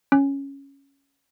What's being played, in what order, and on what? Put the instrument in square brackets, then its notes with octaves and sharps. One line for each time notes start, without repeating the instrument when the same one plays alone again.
[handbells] C#4